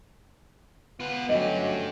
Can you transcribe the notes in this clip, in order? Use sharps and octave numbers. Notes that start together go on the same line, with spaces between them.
B3 F4 B4
D2 G2 F#3 C#4 G4 D#5